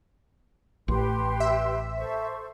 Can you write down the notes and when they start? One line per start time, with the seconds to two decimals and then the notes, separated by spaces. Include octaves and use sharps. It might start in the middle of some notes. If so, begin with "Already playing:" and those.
0.88 A1 G4 B4 C6
1.40 E5
1.98 A4 C5 C#6